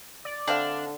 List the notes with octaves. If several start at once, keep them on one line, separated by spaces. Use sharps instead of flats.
D5
D3 C4 D4 E5 F5